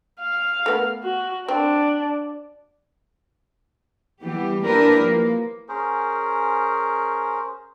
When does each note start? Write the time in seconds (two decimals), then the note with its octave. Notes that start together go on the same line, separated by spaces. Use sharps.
0.21 F5
0.66 A3 B3
1.03 F#4
1.48 C4 D4
4.22 E3 G3 B3 G4
4.65 A#3 D4 E4 G4 A#4 B4
4.99 F3 A#3
5.69 C#4 G#4 A#4 C5